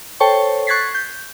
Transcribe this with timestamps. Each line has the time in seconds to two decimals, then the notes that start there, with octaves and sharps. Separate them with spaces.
0.20 A4 C5 C#5 G5 A5 C#6
0.67 C#6 F#6 G#6 A6 B6 C7
0.94 G6